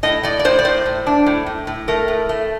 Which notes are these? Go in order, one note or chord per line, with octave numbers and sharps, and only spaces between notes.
A2 D#5
A2 D5
D5
A2 C5
D5
A2 C5
A2
D4
A2
A2
A2
A3 A#4
A2
A3